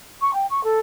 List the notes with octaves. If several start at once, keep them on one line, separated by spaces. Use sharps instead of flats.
C#6
G5
C#6
A4